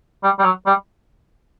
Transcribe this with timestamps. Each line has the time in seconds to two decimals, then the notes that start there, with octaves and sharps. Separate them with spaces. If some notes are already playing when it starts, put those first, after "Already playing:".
0.23 G3
0.39 G3
0.44 F#3
0.66 G3